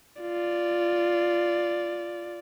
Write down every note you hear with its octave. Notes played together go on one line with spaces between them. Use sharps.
F4 D5